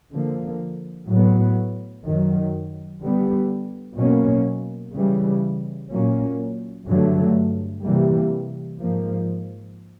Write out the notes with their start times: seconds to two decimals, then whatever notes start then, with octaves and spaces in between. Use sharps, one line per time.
0.12 D3 F3 A#3
1.08 A2 F#3 B3
2.05 F#2 D#3 F#3
3.01 D3 G3 B3
3.97 B2 F#3 A#3 C#4
4.93 C#3 E3 G3
5.89 A#2 F#3 A#3 C#4
6.85 G2 D3 F#3 A3
7.82 C3 E3 G3 A#3
8.78 G#2 F3 A#3